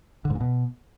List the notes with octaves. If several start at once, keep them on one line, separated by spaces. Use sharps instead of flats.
D3
G#2
A#2
B2